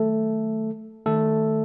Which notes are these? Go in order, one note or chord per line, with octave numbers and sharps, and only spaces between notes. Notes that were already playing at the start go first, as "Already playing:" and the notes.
Already playing: D#3 F#3 A3 A4
D#3 A3 A4